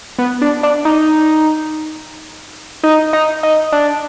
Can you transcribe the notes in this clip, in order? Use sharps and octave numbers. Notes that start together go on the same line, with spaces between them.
B3
D4
D4
D#4
D#4
D#4
D#4
D4